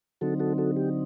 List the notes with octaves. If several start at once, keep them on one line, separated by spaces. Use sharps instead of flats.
D3 F#3 C4 D#4 F#4 A4
F#4 A4
F#4 A4
G4